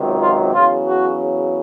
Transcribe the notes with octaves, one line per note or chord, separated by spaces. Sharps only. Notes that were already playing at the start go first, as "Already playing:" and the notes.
Already playing: C#2 C3 D#3 F#3
F4
E2 C#3 F#3 F4
F#4